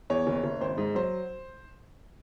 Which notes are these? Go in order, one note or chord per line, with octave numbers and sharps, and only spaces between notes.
E2 C#5
F#1
F#1
G#1 C5
G#2
F#3 C5